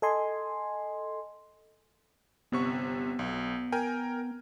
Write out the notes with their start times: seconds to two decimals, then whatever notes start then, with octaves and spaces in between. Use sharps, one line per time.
0.02 A4 D#5 G#5 C6
2.52 G1 C3 B3 C#6
3.19 B1
3.72 A#4 G5 G#5